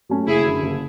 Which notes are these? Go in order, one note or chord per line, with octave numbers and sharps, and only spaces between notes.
F#3 A3 C#4
F#1 E4 G#4
F#2 D3
F#1